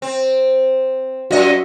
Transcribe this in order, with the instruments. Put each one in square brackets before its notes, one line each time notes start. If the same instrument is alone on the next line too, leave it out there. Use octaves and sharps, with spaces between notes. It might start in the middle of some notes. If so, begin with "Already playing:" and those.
[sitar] C4
[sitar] F#2 D#5 [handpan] F#4 E5